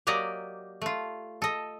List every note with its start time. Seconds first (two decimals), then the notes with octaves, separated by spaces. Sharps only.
0.07 F#3 A#3 G4 D5 D#5
0.82 A3 F4
1.42 A4 D#5